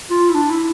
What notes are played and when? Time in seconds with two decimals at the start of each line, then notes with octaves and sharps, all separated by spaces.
0.10 F4
0.30 E4
0.35 D4
0.50 E4